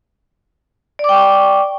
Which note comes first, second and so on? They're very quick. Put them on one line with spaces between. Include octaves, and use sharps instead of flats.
D5 D6 G5 C#6